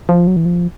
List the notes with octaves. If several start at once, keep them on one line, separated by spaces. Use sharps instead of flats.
F3
F#3
E3
F3